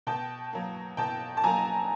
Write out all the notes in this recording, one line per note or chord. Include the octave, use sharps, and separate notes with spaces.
B2 G5 A5
F#3 A#3
B2 G5 A5
A5
F#3 A#3 G#5 A#5